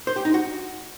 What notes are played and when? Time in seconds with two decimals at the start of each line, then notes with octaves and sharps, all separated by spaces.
0.07 C5
0.16 G4
0.25 D#4
0.34 F#4